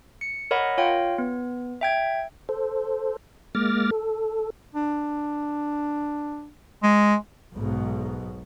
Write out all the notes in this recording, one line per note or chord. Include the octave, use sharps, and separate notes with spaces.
C#7
A#4 C#5 D#5 F#5 B5
F4 C#5 F5 G5
B3
E5 G5 G#6
A4 C5
G#3 A#3 D6 F6 A6 A#6
A4
D4
G#3
B1 G#2 B2